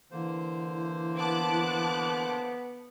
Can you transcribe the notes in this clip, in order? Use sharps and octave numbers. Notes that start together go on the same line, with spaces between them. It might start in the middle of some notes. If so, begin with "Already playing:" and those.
D3 E3 A#3 C5
B3 A5 D6 F#6